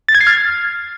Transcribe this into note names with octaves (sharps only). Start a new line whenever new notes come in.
A6
G#6
C7
F6